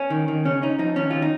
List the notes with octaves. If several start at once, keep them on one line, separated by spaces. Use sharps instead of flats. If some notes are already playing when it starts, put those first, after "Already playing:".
Already playing: C#4
D#3
D#3
C#3 C#4
C#4 D#4
F3 D#4
D#3 C#4
D#3 F4
D#4